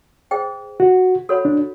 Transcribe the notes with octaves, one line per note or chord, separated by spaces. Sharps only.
G#4 C5 D#5 G5
F#4
F#4 A4 C#5 F#5 B5
D4